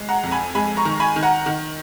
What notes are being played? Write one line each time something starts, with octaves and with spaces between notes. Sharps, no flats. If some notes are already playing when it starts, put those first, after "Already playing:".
Already playing: G#3
F#5 A#5
F2
G#5 B5
G#3 G#5 B5
A#5 C#6
D#3
G#5 B5
D#3
F#5 A#5
D#3